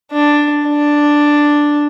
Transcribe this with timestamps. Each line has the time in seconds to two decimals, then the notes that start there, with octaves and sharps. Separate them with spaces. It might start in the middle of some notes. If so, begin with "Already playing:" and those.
0.12 D4
0.66 D4